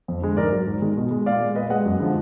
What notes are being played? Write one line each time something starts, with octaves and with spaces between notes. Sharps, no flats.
F2
D3 G#3
G#2 A#4 D5
F#3
G#2
D#3 G#3
B2
G#3
A#2 D5 F5
G#3
A#2 B4 D#5
G#3 D#5 F#5
F#2
D3 F3 G#3